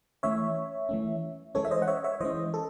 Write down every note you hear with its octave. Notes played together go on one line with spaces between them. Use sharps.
E3 A3 C#4 C#5 E5
E3 A3 C#4
E3 G#3 C#4 A4 C#5
E5
C5 D#5
F#5
C#5 E5
C#5 E5
E3 G#3 C#4 C5 D#5
A4